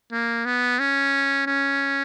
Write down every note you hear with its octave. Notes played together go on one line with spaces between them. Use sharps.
A#3
B3
C#4
C#4